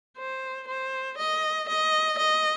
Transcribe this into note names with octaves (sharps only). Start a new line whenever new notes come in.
C5
C5
D#5
D#5
D#5